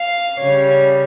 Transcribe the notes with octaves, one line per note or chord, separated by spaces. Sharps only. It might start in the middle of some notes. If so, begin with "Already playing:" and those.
Already playing: F5
C#3 G3 C#5